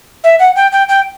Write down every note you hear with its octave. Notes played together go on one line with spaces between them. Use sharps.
E5
F#5
G5
G5
G5